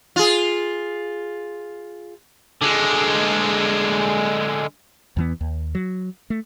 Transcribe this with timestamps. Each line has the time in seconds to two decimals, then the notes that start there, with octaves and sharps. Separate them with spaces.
0.16 F4 G#4
2.62 D3 G#3
5.17 E2 E3 B3
5.41 D#2
5.75 F#3
6.30 A3